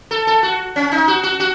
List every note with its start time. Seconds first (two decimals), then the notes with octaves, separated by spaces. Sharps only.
0.11 A4
0.27 A4
0.43 F#4
0.76 C#4
0.91 D#4
1.08 F#4
1.23 F#4
1.40 F#4